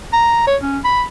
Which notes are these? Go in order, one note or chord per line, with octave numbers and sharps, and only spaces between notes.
A#5
C#5
C#4
B5